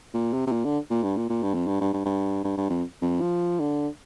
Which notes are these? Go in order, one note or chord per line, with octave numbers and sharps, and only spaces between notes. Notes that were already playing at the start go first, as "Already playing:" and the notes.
A#2
C3
C3
A#2
D3
A#2
G2
A#2
A#2
G2
F2
G2
G2
G2
G2
G2
G2
F2
F2
F3
D3